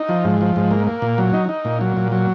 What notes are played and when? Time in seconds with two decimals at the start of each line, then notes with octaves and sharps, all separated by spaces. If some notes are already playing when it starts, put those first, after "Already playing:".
Already playing: D#4
0.09 F3
0.25 G#2
0.41 F3
0.56 G#2
0.71 A#3
0.87 A#3
1.02 A#2
1.18 F#3
1.33 D#4
1.49 D#4
1.65 A#2
1.81 F#3
1.97 A#2
2.12 F#3